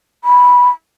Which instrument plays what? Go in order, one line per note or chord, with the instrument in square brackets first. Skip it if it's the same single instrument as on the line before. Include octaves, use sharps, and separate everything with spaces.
[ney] B5